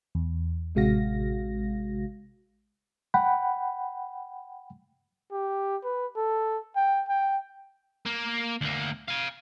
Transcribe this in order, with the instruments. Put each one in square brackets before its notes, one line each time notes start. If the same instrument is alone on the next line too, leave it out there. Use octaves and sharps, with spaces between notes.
[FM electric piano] E2
A1 C3 G#3 F#4 F5 A#6
[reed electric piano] F#5 G5 B5
[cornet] G4
B4
A4
G5
G5
[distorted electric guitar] A#3
D2 A#3
F5 G#5